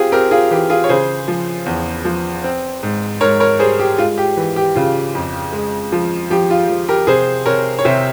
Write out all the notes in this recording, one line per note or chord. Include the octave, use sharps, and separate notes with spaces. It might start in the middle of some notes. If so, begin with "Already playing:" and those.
Already playing: C4 F4 G4 G#4
C4 G4 A#4
F4 G#4
E3 G4
F4 G#4
C#5
C#3 G#4 C5
F3
E2
F3
C4
G#2
G#2 A#4 C#5
A#4 C#5
G3 G#4 C5
G4
G#3 F4
G4
E3
G4
C#3 F4
F2
G#3
F3
F3 G4
F4
F3
G4 A#4
C3 G#4 C5
C3 A#4 C#5
C#5
C3 C5 E5